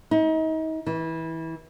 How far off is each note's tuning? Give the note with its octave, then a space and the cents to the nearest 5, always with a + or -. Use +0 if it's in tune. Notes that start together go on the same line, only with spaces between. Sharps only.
D#4 +35
E3 -20